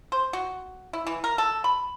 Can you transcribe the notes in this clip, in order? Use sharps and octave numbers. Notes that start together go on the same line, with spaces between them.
C5
F#4
E4
E3
A#4
A4
B5